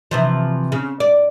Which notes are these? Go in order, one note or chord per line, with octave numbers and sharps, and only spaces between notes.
C3 E3 F3
C#3
D5